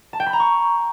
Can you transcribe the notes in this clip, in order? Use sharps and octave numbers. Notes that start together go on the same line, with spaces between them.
A5
G5
B5
A#5
C#6